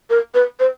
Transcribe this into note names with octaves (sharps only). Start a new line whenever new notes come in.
A#4
B4
C5